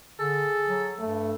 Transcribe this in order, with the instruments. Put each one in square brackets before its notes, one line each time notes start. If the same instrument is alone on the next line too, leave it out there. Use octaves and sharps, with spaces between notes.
[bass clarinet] D3 [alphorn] G#4 [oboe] A4
[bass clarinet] F#3
[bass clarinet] G2 [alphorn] A3